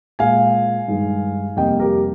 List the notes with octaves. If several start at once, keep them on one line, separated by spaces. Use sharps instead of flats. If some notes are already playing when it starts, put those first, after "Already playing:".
A#2 G#3 F5 G#5
G2 D#3 G#3
F2 C3 G3 A#3 D#5 G5
G4 A#4